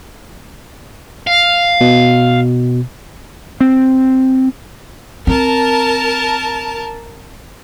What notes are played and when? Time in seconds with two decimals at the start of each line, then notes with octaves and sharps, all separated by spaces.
1.27 F5
1.81 B2
3.61 C4
5.27 C4 A#4 A5